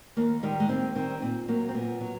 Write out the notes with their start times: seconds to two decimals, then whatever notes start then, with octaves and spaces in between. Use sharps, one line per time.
0.17 D#2 A#3
0.43 D#3 G3 G#3
0.60 G#3
0.69 D#2 C4
0.96 D#3 G3 C4
1.22 A#2 C4
1.48 F#3 A#3
1.69 C4
1.74 A#2 B3
2.01 F#3